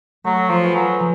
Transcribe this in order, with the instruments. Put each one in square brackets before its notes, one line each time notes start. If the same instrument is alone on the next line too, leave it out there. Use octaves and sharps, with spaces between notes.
[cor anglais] F#3 [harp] A3
[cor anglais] F3
[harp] F4 G#4 B4 F5
[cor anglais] F#3
[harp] F3